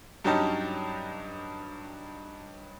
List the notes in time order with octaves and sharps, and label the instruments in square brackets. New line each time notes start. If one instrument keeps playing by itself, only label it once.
[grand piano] G2 F#3 C#4 D#4 G4 A5